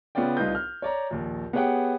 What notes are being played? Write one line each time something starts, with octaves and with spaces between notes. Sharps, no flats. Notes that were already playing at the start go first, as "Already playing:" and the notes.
C#3 B3 C#4 F4 D5 G5
C2 D#4 F4 B4 G6
F6
C#5 D5 A#5
A#1 D#2
B3 G4 G#4 C#5 F#5 G5